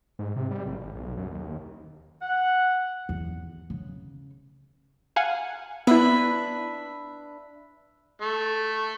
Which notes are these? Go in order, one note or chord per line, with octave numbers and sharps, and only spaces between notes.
G#2
C3
G3
A1
G#1
B1
F#2
D#2
F#5
E2
C#3
F5 F#5 G#5
B3 D4 E4 B4 E5
A3